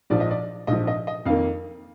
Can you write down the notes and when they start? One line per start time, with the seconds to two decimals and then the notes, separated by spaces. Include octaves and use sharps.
0.10 A#1 G#2 F3 D5
0.20 D#5
0.31 D5
0.67 A#1 G#2 F3 D#5
0.87 D#5
1.07 D#5
1.26 F2 D#3 A#3 F5